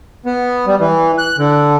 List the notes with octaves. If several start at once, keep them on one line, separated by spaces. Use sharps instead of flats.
B3
G3
E3
F#6
D3